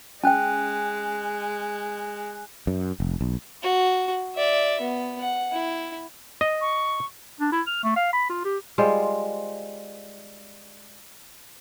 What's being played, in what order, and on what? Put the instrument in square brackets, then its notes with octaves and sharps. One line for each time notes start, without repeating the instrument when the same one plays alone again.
[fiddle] G#3 [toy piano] C#4 G5 [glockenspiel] G#5 F#6
[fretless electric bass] F#2
F1
B1
[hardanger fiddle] F#4
D5 E5
B3
F#5
E4
[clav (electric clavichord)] D#5
[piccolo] C#6
[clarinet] D4
E4
F6
A3
F5
B5
F4
G4
[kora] G3 G#3 F4 C5